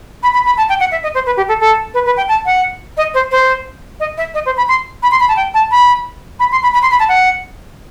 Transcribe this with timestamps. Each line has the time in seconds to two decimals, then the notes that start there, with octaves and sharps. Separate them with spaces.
0.23 B5
0.34 B5
0.46 B5
0.57 A5
0.69 G5
0.80 F#5
0.91 E5
1.03 D#5
1.14 C5
1.26 B4
1.37 G4
1.48 A4
1.60 A4
1.94 B4
2.06 B4
2.17 G5
2.28 A5
2.46 F#5
2.97 D#5
3.14 C5
3.31 C5
4.00 D#5
4.17 E5
4.34 D#5
4.46 C5
4.57 B5
4.68 C6
5.03 B5
5.11 C6
5.20 B5
5.28 A5
5.36 G5
5.54 A5
5.71 B5
6.39 B5
6.52 C6
6.63 B5
6.73 B5
6.82 C6
6.91 B5
6.99 A5
7.08 F#5